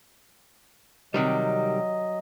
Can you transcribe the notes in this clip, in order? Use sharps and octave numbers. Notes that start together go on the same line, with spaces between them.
C3 D#3 F#3 G3 D#5